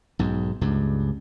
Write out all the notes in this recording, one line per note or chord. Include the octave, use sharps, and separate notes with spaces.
B1 G#2
C#2 G2